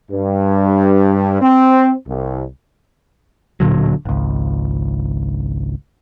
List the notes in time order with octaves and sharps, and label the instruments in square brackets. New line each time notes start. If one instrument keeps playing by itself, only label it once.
[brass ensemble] G2
C4
C2
[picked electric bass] D1 A#2 D3 F#3
G#1 C#2